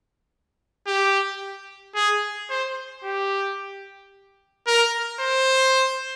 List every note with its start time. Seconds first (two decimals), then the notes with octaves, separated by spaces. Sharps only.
0.87 G4
1.95 G#4
2.50 C5
3.04 G4
4.67 A#4
5.20 C5